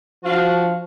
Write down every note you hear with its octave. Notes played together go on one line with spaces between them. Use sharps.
F3 D4 F4 F#4